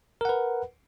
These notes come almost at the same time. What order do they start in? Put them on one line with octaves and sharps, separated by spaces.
A#4 F#5 B4